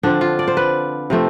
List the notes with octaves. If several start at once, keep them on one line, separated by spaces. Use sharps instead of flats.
D3 F3 C4 D4
F4
D5
C5
B4
C3 F3 A3 C4